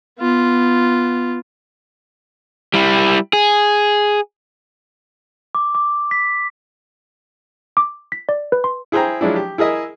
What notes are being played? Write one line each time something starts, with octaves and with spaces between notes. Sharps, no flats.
B3 F4
G3 E4
G#4
D6
D6
B6
D6
B6
D5
B4
C6
E4 G#4 C5 G5 A#5
F3 F#3 G#3 D4 E4
G4
E4 G#4 A#4 D#5 E5